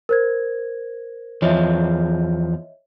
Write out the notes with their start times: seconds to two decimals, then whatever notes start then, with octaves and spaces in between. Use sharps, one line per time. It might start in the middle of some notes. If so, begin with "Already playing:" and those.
0.09 A#4 C5 G#6
1.42 E2 F3 C#5 D#5 E5